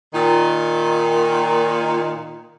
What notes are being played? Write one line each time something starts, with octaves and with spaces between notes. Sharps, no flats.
A#2 D#3